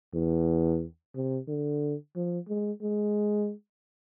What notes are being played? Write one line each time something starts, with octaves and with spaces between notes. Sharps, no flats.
E2
C3
D3
F3
G#3
G#3